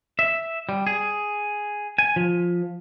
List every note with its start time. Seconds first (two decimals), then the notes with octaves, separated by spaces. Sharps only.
0.19 E5
0.69 G3
0.87 G#4
1.98 G#5
2.16 F3